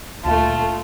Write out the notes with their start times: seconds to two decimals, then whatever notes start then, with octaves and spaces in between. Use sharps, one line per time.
0.25 D#1 D2 A3 F4 A5